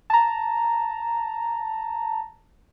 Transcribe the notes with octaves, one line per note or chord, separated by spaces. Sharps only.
A5 A#5